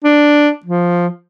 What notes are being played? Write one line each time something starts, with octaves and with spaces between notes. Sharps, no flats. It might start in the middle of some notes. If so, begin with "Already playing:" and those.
D4
F3